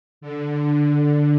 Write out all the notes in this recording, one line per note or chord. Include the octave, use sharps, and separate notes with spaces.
D3